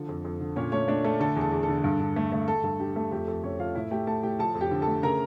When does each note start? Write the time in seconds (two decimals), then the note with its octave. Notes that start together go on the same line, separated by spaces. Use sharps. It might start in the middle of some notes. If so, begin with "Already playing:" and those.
Already playing: D3 F3 A4
0.09 F2
0.25 F2
0.40 D3
0.56 A#2 C#4 C#5
0.72 A3 C#4 C#5
0.88 A3 D4 D5
1.04 A3 A4
1.20 D3 A4
1.36 E2
1.41 A4
1.52 E2
1.63 A4
1.68 D3
1.84 G2
2.00 G2
2.16 A3
2.32 A3
2.48 A3 A4
2.63 G2 A4
2.79 D3 G4
2.96 A3 A4
3.11 F2 G4
3.27 F2 A4
3.43 F2 C#4 C#5
3.59 F2 F4 F5
3.75 A2 E4 E5
3.91 A3 G4 G5
4.07 A3 A4 A5
4.23 A2 G4 G5
4.39 F3 A4 A5
4.55 F2
4.61 G4 G5
4.71 D3
4.82 A4 A5
4.87 A3
5.03 C#3 A#4 A#5